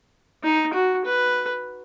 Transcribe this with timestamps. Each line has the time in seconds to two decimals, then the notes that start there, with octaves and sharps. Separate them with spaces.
0.44 D#4
0.74 F#4
1.05 B4